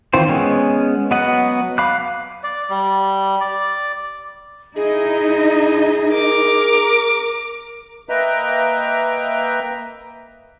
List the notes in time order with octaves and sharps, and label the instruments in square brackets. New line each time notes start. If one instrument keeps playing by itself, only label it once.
[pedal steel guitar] D#3 E3 C4 F4 C5
G#3 B3 C#4
F#3 B3 D#5 F#5
F5 B5 D6 F#6
[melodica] D5
G3
D5
[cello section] D#4 E4 D#5 [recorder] G#4
[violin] A#4 D6
[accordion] A#3 B4 D#5 E5 G5 A#5